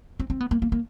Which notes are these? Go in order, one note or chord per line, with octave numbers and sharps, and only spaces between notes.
C4
C4
B3
A#3
A#3
A#3